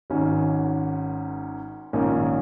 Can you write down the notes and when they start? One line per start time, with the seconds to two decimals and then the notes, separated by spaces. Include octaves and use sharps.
0.10 G#1 G#2 D#3 C#4
1.93 A#1 G#2 D#3 C#4 A#4